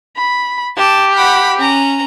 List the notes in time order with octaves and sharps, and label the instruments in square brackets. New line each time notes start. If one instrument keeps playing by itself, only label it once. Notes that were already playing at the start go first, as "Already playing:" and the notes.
[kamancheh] B5
[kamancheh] G4 [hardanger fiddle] A5
[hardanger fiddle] F#5 B5
C#4 A#5